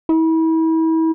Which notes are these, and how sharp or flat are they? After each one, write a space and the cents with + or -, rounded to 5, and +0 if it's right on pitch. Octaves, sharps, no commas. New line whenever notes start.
E4 -35